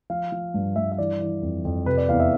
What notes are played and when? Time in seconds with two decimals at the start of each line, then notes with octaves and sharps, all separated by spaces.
0.10 F3 F5
0.32 F3
0.54 G2
0.76 G2 E5
0.92 E5
0.98 E3 D5
1.20 E3
1.42 F2
1.65 F2
1.86 C3 B4
1.97 D5
2.09 E2 F5
2.20 E5